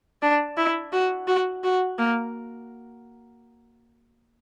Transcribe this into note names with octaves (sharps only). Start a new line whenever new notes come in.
D4
E4
F#4
F#4
F#4
A#3